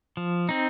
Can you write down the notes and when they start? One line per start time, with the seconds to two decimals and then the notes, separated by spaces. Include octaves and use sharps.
0.17 F3
0.49 C4 D#4